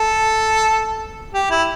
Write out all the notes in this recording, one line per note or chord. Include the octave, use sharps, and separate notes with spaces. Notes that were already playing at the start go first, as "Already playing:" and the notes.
Already playing: A4
G4
E4